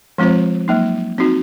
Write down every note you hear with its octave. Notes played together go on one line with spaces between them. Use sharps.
F3 G#3 C4 F4 C5
F#3 A#3 D#4
C4 D#4 F#4